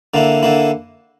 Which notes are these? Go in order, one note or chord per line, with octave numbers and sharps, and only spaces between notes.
D3 A#3 E4
D3 A#3 E4